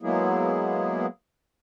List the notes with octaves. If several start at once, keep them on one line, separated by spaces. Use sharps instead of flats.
F#3 G#3 A#3 B3 E4 G#4